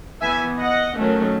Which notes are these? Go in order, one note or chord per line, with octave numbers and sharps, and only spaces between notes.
E3 B3 E5 G#5
D#5 F#5
D#3 F#3 A3 C#4